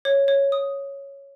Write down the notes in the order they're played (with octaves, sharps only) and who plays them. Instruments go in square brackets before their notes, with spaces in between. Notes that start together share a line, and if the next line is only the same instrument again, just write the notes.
[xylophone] C#5
C#5
D#6